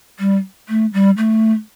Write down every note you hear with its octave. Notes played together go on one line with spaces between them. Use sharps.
G3
A3
G3
A3